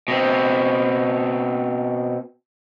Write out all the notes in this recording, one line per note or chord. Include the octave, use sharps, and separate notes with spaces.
B2 C4